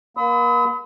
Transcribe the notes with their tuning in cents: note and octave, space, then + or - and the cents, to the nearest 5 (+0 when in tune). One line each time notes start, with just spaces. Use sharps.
A#3 +35 B5 +35 D#6 +45